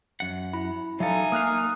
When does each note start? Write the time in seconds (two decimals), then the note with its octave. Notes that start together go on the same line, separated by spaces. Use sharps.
0.20 F#2 F#5
0.53 E4 B5
1.00 F#3 D#4 A4 E5 F5 G#5
1.32 A#3 F5 D#6 F6 F#6